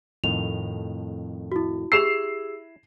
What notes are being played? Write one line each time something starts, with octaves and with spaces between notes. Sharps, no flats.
F2 A2 D#3 F7
E4 F#4
E4 G4 G#4 E6 C7 E7 F7